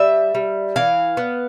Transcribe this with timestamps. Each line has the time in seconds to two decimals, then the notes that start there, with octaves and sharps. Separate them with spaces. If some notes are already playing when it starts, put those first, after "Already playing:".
Already playing: G3 E5
0.35 G3
0.76 E3 F5
1.17 B3